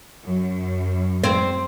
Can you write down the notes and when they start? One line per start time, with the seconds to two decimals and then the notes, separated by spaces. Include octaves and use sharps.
0.25 F#2
1.24 C4